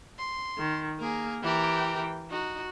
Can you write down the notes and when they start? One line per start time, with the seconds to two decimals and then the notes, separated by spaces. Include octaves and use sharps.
0.18 C6
0.58 D#3
0.99 A#3 G#4 A#4
1.43 E3 G4 A#4 G5
2.30 D#4 F#4